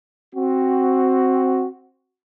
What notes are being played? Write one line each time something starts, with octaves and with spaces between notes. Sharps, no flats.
C4 F#4